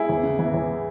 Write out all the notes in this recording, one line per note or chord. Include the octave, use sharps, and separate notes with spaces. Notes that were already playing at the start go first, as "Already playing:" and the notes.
Already playing: E4 G#4
E2
C#3
E3
E2